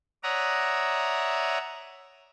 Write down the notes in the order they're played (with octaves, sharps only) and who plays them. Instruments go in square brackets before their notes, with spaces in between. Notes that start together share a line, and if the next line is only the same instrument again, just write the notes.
[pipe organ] C#5 D5 E5 F#5 A#5 D#6